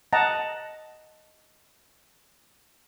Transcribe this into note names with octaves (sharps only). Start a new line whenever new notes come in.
D#5 F#5 A5 A#5